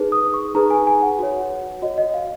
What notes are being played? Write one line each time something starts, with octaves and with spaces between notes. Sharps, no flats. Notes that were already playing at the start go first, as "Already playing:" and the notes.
Already playing: D#4 G#4 B4
D#6
C#6
D#4 G#4 B4 A#5
G#5
G#5
F#5
F#4 C#5
F#4 C#5 D#5
D#5
F5